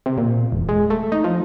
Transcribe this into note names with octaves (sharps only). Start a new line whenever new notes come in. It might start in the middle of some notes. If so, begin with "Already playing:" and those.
C3
A#2
E1
G#3
A3
D#4
F3